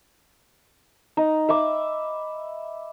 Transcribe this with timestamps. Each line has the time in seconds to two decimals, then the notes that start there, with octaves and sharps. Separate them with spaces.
1.17 D#4
1.49 E5 B5 D6